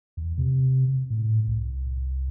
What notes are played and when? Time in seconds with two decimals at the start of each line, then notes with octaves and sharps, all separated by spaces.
0.17 E2
0.38 C3
1.10 A2
1.48 C2